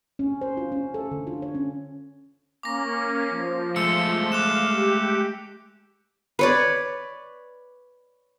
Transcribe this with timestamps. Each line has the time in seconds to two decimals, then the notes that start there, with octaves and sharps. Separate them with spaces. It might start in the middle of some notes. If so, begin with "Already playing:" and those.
0.19 C#4
0.41 C5
0.57 F4
0.72 C#4
0.94 A4
1.11 D3
1.27 F4
1.42 C#5
1.55 C#4
2.63 A#3 C#4 D6 A#6
3.30 F3
3.76 G#3 A3 E6 C#7
4.32 F5 D6 F#6 E7
4.69 G4
6.39 B4 C#5 D5